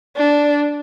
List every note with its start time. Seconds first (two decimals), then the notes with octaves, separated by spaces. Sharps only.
0.17 D4